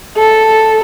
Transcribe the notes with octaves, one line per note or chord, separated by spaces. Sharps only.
A4